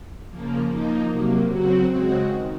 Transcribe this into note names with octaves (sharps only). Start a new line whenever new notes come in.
C#3 F3 A#3
F3 A#3 D#4
C3 F#3 A#3
C#3 F#3 C4 F#4
C#3 G#3 C4 F#4
D#3